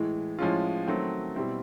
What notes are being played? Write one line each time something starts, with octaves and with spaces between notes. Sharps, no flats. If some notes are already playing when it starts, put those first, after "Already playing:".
Already playing: A2 E3 G#3
A2 F3 G#3 C#4 F4
D#3 F#3 A3 C4
B2 G3 C4 E4